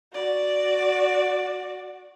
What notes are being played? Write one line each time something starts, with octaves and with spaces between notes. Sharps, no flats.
F#4 D5